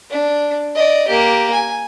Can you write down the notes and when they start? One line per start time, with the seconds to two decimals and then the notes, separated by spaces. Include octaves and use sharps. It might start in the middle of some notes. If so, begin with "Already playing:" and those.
0.10 D4
0.75 D5 D#5
1.08 A#3 G4
1.52 G#5